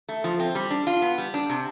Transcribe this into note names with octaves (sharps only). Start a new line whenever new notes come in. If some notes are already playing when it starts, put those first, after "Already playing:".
A3
F3
C4
G3
D4
F4
B3
G3
D4
C3